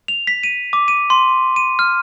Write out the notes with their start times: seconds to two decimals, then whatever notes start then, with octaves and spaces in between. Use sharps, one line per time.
0.08 F7
0.27 B6
0.43 D#7
0.73 D6
0.88 D#7
1.10 C6
1.56 D#7
1.79 F6